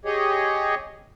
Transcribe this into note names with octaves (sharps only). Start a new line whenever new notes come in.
G4 G#4 C#5 D#5